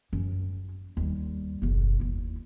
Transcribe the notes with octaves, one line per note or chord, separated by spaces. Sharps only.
F#2 C#4
D#2 G3
F#1 B1
D#2 E4